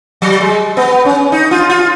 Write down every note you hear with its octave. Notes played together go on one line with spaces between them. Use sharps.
F#3
G#3
B3
C#4
D#4
F4
F4